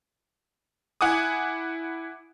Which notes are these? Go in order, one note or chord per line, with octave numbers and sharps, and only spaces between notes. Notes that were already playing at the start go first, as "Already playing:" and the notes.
E4 F#5 G#5 D6 D#6